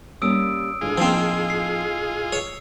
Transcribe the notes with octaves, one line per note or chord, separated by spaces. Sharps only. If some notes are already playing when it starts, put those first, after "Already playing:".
G3 A#3 C#4 D#6 E6 D7
A2 D3 G#3 F4 G#4
A2 F3 A#3 C4 D#4 E6 C7
C7
C#5